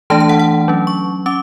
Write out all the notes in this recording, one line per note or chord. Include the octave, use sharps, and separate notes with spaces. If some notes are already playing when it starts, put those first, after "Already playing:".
E3 A3 D4 A5
A5
F#5
F#5
F#3 C#4
C#6
C#4 D6